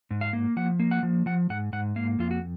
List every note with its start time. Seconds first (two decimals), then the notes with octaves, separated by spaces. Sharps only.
0.11 G#2
0.21 F5
0.33 A#3
0.56 F3 F#5
0.79 A#3
0.91 F#5
1.03 F3
1.26 F3 F#5
1.50 G#2 F#5
1.73 G#2 F#5
1.96 A#3 F5
2.19 F2 F4
2.31 F#4